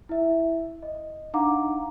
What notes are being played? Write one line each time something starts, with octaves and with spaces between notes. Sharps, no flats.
E4 E5
D#5
D4 D#4 F5 F#5 A#5 D6